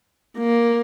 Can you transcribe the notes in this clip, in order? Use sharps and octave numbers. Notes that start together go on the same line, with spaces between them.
A#3